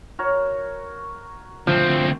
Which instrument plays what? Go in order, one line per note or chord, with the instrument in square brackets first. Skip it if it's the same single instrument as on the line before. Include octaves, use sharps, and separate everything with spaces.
[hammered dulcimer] F#4 A#4 C#5
[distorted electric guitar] D2 C4 [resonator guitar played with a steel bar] F3